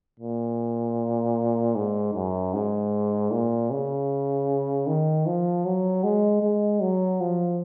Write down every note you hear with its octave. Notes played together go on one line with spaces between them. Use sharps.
A#2
G#2
F#2
G#2
A#2
C#3
D#3
F3
F#3
G#3
G#3
F#3
F3